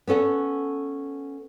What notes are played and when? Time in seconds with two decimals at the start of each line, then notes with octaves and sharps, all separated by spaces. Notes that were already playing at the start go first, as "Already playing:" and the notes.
0.07 B3 C#4 A4 F#5